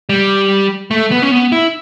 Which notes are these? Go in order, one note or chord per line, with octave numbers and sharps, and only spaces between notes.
G3
A3
B3
C#4
B3
E4